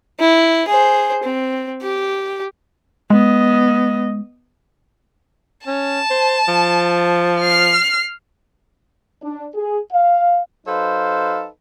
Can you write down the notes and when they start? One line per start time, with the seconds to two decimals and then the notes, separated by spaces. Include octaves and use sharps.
0.19 E4
0.68 G#4 C5
1.24 C4
1.82 G4
3.10 G#3 B3 D#5
5.67 C#4 A5
6.10 C5
6.48 F3
7.40 F6 C7
9.22 D4
9.55 G#4
9.92 F5
10.67 F#3 D#4 A4 B4 C5 F5